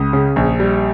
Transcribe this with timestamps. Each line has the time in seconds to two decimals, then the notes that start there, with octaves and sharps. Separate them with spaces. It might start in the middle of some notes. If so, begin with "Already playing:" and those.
Already playing: C#2 D#6
0.13 C#3
0.36 A#1
0.60 G3